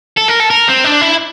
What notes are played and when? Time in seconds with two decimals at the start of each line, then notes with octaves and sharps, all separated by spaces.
0.17 A4
0.29 A#4
0.40 A4
0.50 A#4
0.68 C4
0.84 D4
1.01 E4